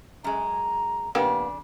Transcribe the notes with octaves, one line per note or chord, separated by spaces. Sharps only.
F#2 G#3 A#5
F2 C#3 A#3 B3 D4 G4